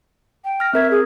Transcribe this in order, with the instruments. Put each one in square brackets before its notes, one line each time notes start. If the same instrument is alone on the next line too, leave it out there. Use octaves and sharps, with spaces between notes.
[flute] G5
[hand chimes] F6 A#6
[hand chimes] C4 A#4 G#6 [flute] E5
[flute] G#4